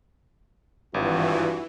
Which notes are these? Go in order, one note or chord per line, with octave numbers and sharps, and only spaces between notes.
G#1 G2 E3 C4 F4 F#4